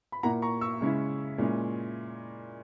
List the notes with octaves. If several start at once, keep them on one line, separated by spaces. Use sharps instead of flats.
B5
A#2 A#3 E4 F#5 A#5
A#5 C#6
C#6 E6
C#3 G#3 C#4 E4
A#2 G#3 C#4 E4